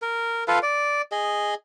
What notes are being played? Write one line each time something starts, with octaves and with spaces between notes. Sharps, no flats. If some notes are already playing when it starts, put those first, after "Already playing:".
A#4
F4 A4 B4 F5
D5
G#4 D#5